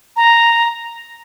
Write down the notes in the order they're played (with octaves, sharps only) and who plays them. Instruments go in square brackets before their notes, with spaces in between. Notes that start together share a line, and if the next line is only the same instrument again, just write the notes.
[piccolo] A#5